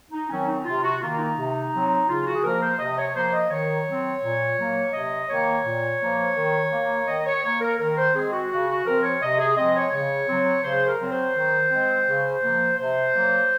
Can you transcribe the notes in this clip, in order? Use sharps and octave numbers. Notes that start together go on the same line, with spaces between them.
D#4
D#3 F#3 C4 C#4
D#4
C3 F4
F#4
D#3 A#3 F4
D#4
C3
F#3 C4
C#3 F4
F#4
G#4
F3 A#3 A#4
C5
C3 D#5
C#5
F3 A#3 C5
D#5
D#3 C#5
F#3 C4
A#2
F#3 A#3
C3 D#5
D#3 A#3 C#5
A#2
F3 A#3
D#3
A#3
D#3 D#5
C#5
A#3 C#5
A#4
D#3 A#4
C5
G#3 C4 G#4
F#4
C#3 F#4
F#4
F3 C4 A#4
C#5
C3 D#5
G#4
F3 G#3 C4 D#5
C#5
C#3 C#5
F#3 C4
C#3 C5
A#4
F#3 C4
C5
D#3
G#3 C4
C#3
F3 A#3
C3 C5
F#3 A#3